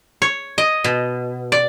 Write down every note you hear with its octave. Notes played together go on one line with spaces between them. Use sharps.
C#5
D#5
B2
D5